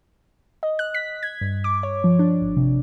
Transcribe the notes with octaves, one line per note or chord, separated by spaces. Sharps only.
D#5
F#6
B6
G#6
G2
D6
C#5
F3
D4
G#1
C3